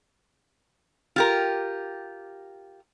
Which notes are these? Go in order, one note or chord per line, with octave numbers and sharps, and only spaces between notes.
F4 G4 A#4